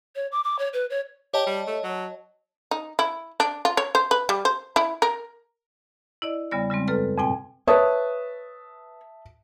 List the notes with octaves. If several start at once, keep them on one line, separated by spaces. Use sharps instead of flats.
C#5
D6
D6
C#5
B4
C#5
G4 C#5 D#5 A5
G3
A3
F#3
D#4
E4
D4
F4
C#5
C5
B4
G3
C5
E4
A#4
E4 D5 D#5
E2 C#3 G3 B3 D5
C#3 G3 G#3 C4
F#2 A4 B4 F6
F2 G#2 B2 C4 G5 G#5
B4 C#5 E5 A5 D#6